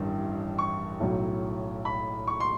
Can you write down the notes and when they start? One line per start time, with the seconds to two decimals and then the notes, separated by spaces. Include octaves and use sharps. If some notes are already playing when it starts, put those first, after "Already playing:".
Already playing: A1 G2 D#3
0.59 C#6
1.00 B1 A2 F#3
1.85 B5
2.27 C#6
2.40 C6